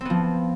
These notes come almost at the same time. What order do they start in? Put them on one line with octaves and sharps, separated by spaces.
C4 B3 F3